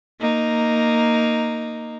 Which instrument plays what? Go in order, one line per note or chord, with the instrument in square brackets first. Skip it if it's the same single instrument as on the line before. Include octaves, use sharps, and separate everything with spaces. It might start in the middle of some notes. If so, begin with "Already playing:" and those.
[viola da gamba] A#3 D#4